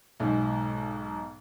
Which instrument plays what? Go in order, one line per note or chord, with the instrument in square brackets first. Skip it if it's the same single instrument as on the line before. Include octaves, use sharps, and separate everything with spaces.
[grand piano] B1 G#2